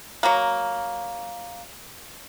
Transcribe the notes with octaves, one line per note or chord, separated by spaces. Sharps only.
F#3 A#3